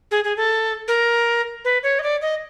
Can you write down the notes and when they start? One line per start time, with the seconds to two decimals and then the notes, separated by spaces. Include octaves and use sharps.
0.11 G#4
0.24 G#4
0.37 A4
0.88 A#4
1.65 B4
1.83 C#5
1.99 D#5
2.03 D5
2.22 D#5